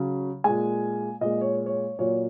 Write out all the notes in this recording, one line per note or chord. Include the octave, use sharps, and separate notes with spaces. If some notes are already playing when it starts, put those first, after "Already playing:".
Already playing: C#3 F#3
A#2 G#3 G#5
A#2 G#3 D#5
C#5
C#5
A#2 F#3 C#5